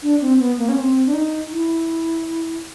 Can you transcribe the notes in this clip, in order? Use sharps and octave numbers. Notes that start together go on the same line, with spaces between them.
D4
C4
B3
A#3
C#4
C4
D4
D#4
E4